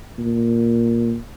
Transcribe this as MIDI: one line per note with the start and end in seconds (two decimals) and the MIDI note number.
0.18 1.15 46